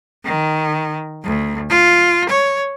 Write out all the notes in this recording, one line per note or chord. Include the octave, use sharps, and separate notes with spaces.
D#3
D2
F4
C#5